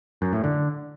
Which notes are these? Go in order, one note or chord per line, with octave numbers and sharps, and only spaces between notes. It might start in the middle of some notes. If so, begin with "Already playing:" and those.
F#2
A2
D3